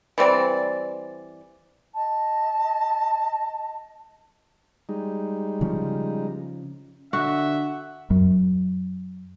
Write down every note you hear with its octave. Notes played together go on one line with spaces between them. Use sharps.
E3 G3 C4 D5
D#5 A5
G3 G#3 D#4
C#3 F3 C#4
D3 F#4 E5 F#5
F#2